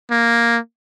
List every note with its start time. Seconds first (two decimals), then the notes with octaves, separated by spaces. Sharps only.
0.11 A#3